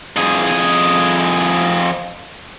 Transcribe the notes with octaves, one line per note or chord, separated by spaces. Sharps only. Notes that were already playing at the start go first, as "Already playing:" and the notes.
F2 G#4